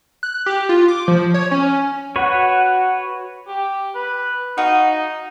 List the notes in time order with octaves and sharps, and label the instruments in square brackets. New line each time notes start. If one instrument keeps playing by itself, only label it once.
[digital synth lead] F#6
G4
F4
D6
F3
C#5
C#4
[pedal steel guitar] F#4 B4 C#5 [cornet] F#5
[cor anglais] G4
B4
[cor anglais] D#4 [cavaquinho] F#4 F5